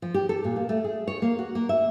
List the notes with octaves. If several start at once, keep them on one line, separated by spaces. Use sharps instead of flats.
F3
G4
A4
A#2
A#3
A3
G#4
C#5
A#3
F#4
A#3
E5